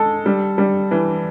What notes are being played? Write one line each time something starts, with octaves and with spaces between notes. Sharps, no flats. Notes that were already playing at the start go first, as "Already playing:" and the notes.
Already playing: G#3 A4
G3
G3
E3